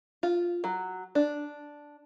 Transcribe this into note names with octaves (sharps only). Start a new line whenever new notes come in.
F4
F#3
D4